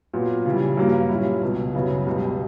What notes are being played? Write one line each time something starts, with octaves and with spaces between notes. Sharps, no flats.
A#2 F#3 B3
C#3 E3 G3
G2 F#3 A#3
A#2 G3 C#4 E4
C#2 B2 G3
F#2 C#3 F#3 B3 E4
C#2 B2 G3 B3